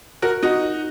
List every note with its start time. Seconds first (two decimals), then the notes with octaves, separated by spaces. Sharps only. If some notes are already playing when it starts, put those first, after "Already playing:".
0.22 F#4 A#4
0.43 D#4 F#4